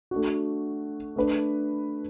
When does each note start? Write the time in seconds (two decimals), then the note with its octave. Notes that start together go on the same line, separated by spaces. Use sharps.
0.11 A3 D4 F#4
1.16 A3 D4 B4